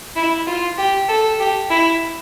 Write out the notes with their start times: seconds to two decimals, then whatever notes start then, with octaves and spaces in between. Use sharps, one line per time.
0.16 E4
0.47 F4
0.78 G4
1.09 A4
1.40 G4
1.71 E4